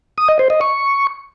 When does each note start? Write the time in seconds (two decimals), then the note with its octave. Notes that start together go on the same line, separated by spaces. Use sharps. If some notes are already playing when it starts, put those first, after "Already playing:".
0.18 D#6
0.28 D#5
0.39 C5
0.50 D#5
0.61 C#6